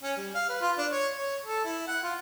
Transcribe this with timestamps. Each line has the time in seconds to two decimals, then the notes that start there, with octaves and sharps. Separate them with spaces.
0.03 C#4
0.17 G3
0.35 F5
0.49 B4
0.61 F4
0.78 D4
0.91 C#5
1.17 C#5
1.45 A4
1.65 E4
1.88 F#5
2.03 F4